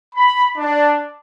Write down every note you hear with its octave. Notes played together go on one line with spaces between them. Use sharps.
B5
D4